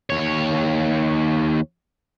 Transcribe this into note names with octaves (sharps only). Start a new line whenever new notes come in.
D#2 C#5